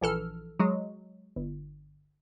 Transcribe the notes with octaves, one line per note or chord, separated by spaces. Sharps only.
A#1 E3 A4 F6
F#3 G#3
G1